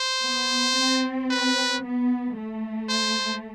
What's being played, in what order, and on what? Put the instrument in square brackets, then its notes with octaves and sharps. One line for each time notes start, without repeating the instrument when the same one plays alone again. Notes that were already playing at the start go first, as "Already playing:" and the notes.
Already playing: [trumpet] C5
[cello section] B3
C4
[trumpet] B4
[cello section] B3
A3
[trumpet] C5